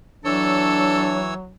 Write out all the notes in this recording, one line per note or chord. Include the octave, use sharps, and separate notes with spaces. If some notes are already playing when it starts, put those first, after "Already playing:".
E3 F#3 D4 A4 C#5 E6